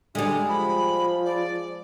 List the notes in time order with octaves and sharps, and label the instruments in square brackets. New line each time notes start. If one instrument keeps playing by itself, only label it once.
[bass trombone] D3 [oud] G3 G#3
[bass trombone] F3 [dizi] B5
[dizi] D5